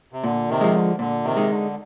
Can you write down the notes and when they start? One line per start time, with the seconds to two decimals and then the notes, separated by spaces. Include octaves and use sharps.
0.12 C3
0.23 A#2 D3
0.49 C3 D#3
0.61 F3 G#3
0.74 D3
0.99 A#2 D3
1.24 C3 D#3
1.36 G#3 D#4
1.49 D3